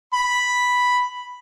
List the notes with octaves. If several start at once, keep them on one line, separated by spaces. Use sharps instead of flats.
B5